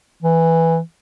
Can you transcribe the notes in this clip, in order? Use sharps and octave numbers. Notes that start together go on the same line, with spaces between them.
E3